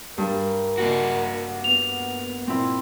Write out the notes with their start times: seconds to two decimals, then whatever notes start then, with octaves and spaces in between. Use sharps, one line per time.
0.18 G2 A#4
0.78 A#3 F#4
1.64 B3 F7
2.47 A#2 C4 E4